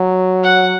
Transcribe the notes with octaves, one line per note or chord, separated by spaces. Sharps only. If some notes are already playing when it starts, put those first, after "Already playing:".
Already playing: F#3
F#5